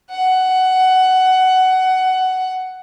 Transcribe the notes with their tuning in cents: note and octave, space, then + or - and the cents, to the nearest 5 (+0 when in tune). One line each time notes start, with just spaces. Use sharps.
F#5 +15